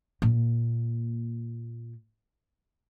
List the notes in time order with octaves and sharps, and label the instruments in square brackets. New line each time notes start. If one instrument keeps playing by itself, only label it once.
[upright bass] A#2 A#3